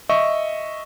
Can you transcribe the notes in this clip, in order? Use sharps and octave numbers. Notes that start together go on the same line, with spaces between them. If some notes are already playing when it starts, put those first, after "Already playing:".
D#5 E5 C#6